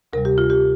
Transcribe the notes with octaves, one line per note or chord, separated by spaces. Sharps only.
D2 C3 G3 A#4
G4
F4
G4